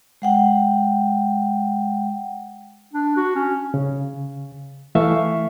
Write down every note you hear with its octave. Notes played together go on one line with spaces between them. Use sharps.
G#3 F#5 G5
D4
F#4
C#4
C#3
E3 A3 E5 F5 C#6